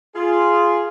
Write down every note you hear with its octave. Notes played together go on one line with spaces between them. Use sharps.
F4 G#4